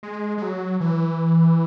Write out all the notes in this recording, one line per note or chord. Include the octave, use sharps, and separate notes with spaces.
G#3
G#3
F#3
E3